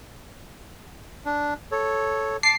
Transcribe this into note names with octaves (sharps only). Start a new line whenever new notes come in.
D4
A4 C#5
A5 D6 C7